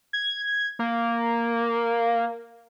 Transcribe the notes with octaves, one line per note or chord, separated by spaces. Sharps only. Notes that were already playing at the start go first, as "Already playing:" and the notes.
G#6
A#3